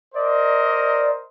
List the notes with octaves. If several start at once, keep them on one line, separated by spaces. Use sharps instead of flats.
A#4 C5 D5 D#5